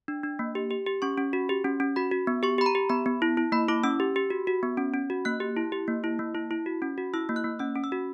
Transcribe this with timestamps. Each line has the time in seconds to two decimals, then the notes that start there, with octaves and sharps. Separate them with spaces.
0.08 D4
0.23 D4
0.39 A#3
0.55 G4
0.71 G4
0.86 G4
1.02 C#4 C#6
1.18 C#4
1.33 F#4
1.49 G4
1.64 C#4
1.80 C#4
1.96 F#4 B5
2.11 F#4
2.27 B3
2.43 G4 C#6
2.58 G4 B5
2.66 A#5
2.75 G4
2.90 B3 B5
3.06 B3
3.22 E4
3.37 E4
3.52 A#3 B5
3.68 E4 D6
3.83 C#4 E6
4.00 G4
4.16 G4
4.30 F#4
4.47 F#4
4.63 B3
4.77 C#4
4.94 C#4
5.10 F#4
5.25 A#3 F#6
5.40 G4
5.57 E4
5.72 G4
5.88 A#3
6.04 E4
6.19 A#3
6.35 E4
6.51 E4
6.66 F#4
6.82 C#4
6.98 F#4
7.14 E4 E6
7.29 A#3
7.36 F#6
7.44 A#3
7.59 C#4 E6
7.75 C#4
7.84 E6
7.92 F#4